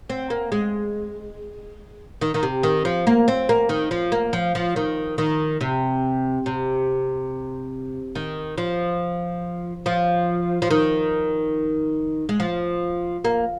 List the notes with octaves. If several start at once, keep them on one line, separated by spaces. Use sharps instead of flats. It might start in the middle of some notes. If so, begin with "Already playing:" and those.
C4
A#3
G#3
D#3
D#3
C3
D#3
F3
A#3
C4
A#3
D#3
F3
A#3
F3
F3
D#3
D#3
C3
C3
D#3
F3
F3
F3
D#3
G#3
F3
A#3